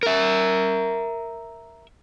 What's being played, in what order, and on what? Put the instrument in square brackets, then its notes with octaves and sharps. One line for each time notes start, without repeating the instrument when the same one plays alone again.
[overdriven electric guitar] A#4 E5